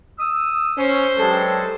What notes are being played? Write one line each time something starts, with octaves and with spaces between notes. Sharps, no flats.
D#6 E6
C#4 C5
G2 F#3 G#3 G4 A4